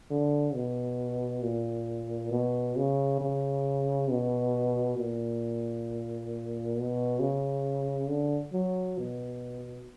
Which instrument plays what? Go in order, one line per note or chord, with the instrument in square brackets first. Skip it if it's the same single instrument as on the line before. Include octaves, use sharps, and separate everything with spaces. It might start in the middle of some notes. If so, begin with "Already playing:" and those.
[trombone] D3
B2
A#2
B2
C#3
C#3
B2
A#2
B2
C#3
D3
F#3
B2